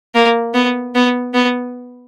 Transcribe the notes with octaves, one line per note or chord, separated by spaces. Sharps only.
A#3
B3
B3
B3